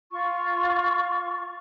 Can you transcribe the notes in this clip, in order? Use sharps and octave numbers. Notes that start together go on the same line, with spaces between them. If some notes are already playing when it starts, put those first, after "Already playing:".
F4 C#6